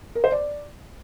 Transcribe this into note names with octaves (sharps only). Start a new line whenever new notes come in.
A#4
C5
D5